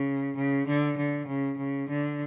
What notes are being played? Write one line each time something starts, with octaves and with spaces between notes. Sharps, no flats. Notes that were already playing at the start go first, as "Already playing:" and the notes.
Already playing: C#3
C#3
D3
D3
C#3
C#3
D3